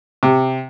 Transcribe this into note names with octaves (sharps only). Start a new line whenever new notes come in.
C3